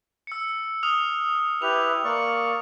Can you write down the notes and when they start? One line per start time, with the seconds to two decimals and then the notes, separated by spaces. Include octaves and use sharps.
0.27 E6 C#7
0.83 D#6 F6 F7
1.62 E4 G4 B4 F7
2.04 A#3 D5 C#6